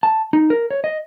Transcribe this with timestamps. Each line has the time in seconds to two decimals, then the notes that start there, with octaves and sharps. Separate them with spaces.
0.03 A5
0.33 D#4
0.50 A#4
0.71 C#5
0.84 D#5